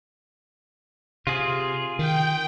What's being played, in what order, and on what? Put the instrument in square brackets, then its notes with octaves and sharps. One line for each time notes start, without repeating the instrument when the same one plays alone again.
[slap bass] C3 [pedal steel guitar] F4 G#4
[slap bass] D#3 [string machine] G5